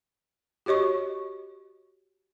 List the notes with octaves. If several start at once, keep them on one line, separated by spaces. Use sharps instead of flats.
F#4 G4 C#5 D#5 C#6